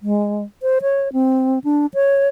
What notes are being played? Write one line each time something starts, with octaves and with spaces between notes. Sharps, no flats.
G#3
C5
C#5
C4
D4
C#5